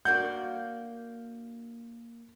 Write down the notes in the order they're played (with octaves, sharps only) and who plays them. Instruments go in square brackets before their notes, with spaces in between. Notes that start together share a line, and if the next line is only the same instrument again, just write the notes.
[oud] A#3 D4 F#4 [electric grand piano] G6